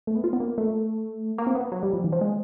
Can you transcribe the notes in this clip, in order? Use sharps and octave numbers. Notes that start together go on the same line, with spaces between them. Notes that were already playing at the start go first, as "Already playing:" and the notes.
A3
B3
F4
B3
A#3
A3
A#3
C4
B3
F#3
G3
F3
E3
F3
G#3